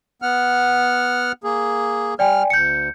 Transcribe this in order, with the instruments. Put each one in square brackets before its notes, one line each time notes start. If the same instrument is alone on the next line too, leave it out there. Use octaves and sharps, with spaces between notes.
[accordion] B3 F#5 F6
A#3 G#4
[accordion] G3 F6 [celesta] D5 G5 G#5
[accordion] D2 [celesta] G6 C#7